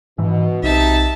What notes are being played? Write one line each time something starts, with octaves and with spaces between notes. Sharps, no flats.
G#2 B2 E3
B1 C3 D#4 E5 A5